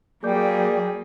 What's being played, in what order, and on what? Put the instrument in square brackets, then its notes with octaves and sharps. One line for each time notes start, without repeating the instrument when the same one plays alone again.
[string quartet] F#3 G3 [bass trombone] A#3 [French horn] G#4 [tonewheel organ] D5 G5